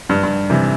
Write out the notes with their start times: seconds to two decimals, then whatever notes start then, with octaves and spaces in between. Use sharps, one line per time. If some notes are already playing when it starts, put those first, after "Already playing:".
0.09 G2
0.23 G2
0.50 C3 E3